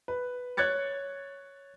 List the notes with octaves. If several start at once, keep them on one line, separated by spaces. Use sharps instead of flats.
B4
C#5 F#6 G#6 A6 C#7